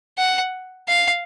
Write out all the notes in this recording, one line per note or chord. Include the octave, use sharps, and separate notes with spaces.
F#5
F5